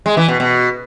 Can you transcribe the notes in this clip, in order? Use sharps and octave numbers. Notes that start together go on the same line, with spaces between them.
G#3
E3
B2
B2